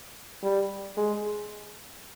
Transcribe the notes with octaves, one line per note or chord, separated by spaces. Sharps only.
G3
G#3